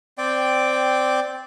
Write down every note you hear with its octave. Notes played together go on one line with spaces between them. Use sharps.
C4 D5 G5